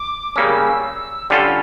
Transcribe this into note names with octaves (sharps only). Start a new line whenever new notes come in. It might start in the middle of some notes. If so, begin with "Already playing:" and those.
Already playing: D6
C#3 G3 A#3 C#4 E6
D3 G3 C#4 F4 A4 G5
F5